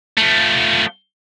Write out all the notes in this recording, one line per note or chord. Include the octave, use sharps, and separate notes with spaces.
F3 A3